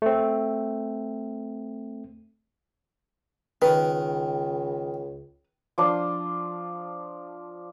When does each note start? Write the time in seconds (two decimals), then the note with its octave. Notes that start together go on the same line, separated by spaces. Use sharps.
0.02 A3 C4
3.62 C#2 D#3 B4
5.78 F3 D4 C6